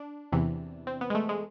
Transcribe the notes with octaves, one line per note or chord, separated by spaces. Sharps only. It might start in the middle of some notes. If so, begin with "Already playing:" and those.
Already playing: D4
E2 C3 E3
C4
B3
G#3
A3
G#3